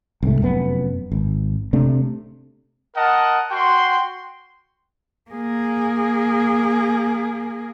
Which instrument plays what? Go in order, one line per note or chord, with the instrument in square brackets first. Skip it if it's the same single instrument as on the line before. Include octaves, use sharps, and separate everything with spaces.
[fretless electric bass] C2 G#2 A3
F1 F#2 B3
G#1
C3 A3 D4
[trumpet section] A#4 D#5 F#5 A5
F#4 G5 C6
[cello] A#3 G#4